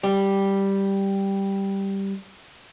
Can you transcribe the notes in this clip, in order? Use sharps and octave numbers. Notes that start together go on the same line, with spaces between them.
G3 G4